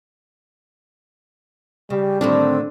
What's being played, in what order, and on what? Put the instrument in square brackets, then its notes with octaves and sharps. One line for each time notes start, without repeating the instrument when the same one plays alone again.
[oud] C#3 [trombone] G3 [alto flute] G4
[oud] A2 D3 D#3 [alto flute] C4 [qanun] D4